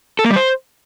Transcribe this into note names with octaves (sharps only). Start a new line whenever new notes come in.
A4
A#3
G3
C5